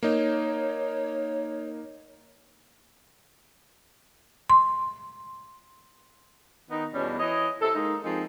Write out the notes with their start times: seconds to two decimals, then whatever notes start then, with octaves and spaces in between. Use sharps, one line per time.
0.03 A#3 D#4 C#5
4.50 C6
6.70 D#3 B3 D#4
6.93 E2 B2 G3 C#4
7.19 E3 C#5 D#5
7.62 C3 A4
7.75 G#3 A#3 D#4
8.04 F3 G#3 A#3 C4 D#4